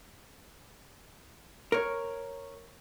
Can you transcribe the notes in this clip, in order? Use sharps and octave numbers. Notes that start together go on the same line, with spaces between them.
A#4 C#5